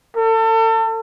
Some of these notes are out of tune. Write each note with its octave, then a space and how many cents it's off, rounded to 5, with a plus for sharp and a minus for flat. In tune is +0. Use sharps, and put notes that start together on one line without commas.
A4 +35